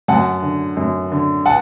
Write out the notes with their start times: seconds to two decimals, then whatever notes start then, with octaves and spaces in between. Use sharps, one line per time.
0.08 F#2 F#5 A5
0.42 D3
0.77 F#2
1.12 D3
1.46 F#5 A5